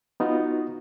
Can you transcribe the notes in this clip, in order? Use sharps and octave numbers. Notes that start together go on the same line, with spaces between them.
B3 D#4 F4 F#4